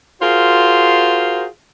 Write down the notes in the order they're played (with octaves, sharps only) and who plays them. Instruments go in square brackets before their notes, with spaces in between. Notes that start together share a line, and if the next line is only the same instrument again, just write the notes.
[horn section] F4 F#4 G#4 A#4 C5